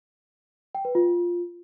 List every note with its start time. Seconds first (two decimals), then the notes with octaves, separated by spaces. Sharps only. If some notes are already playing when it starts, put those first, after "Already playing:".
0.75 G5
0.85 B4
0.95 F4